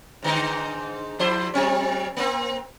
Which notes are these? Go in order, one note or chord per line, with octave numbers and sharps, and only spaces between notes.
G#2 D3 D#4
F3 E4 C5
F#3 C4 C#4
A#3 C4